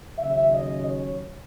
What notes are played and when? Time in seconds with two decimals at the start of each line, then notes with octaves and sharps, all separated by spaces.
0.17 D#2 C#3 F#3 C#4 E5
0.52 D#5
0.87 C#5